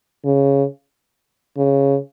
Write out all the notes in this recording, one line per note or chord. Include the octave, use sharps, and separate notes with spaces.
C#3
C#3